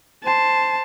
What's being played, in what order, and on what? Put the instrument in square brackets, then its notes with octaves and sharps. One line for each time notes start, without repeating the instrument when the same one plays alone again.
[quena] C5 [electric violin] A5